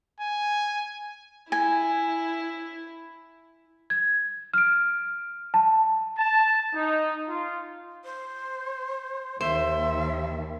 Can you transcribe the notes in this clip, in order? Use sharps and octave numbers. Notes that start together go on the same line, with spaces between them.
G#5
E4 G#5
G#6
F6 D7
A5
A5
D#4
F4
C5
D#2 C5 E5